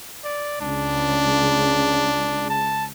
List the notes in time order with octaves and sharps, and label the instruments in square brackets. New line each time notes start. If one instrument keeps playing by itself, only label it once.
[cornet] D5
[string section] C#2 C#3 [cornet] D4
[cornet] A5